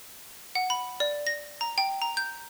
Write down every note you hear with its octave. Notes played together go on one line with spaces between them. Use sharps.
F#5
B5
D5
A#6
A#5
G5
A#5
G6